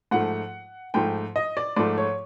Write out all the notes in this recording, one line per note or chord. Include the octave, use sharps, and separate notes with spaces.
G#2 F3 A3 F#5
G#2 F3 A3 G5
D#5
D5
G#2 F3 A3 D5
C#5